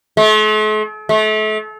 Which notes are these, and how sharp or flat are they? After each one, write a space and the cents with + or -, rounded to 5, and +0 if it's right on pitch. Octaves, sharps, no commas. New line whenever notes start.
A3 -45
A3 -35